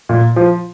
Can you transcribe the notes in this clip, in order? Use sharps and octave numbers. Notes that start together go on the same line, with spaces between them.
A#2
F3